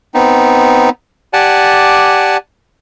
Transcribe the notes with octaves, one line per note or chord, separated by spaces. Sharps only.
B3 C4 D#4
G4 D5 F#5 G#5 A5